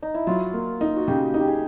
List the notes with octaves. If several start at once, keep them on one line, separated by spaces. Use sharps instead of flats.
D#4
E4
F#3 F4
A#3
D#4
F#4
C#3 G4
D#4
G4
G#4